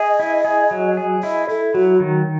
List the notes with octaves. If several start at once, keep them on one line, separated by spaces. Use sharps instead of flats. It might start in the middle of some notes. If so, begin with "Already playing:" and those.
Already playing: G#4 D#5
E4
G#4
F#3
G#4
E4 D#5
E4 A4
F#3 F#4
D#3